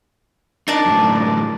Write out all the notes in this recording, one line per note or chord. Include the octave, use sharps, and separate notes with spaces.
D4 D#4 A#4 D5 A5
F#2 A2